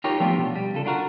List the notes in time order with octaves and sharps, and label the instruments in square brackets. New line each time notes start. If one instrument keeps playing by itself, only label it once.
[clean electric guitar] D#4 F4 G4 A#4 C#5
F3 A3 B3 D4 F4 G4
B2
G3
C#3 F4 A4
D4 F4 F#4 A#4